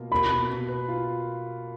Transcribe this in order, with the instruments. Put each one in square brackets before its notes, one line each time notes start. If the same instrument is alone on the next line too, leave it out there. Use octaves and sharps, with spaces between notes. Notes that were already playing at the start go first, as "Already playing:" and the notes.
Already playing: [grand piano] B2 A#3 F4
[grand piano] A#3 [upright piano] B5
[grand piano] B2
B2
B4
F4